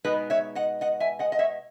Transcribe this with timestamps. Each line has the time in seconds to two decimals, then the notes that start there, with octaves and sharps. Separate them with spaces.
0.04 B2 G#3 B3 D#4 B4 D#5
0.30 C#5 E5
0.55 D#5 F#5
0.81 D#5 F#5
1.00 E5 G#5
1.19 D#5 F#5
1.32 D#5
1.39 C#5 E5